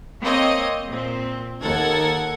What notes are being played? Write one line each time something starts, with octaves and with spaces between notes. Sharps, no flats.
A#3 C4 C#5 D#5
A#2 C4
D#2 A4 A#4 F#5 G#6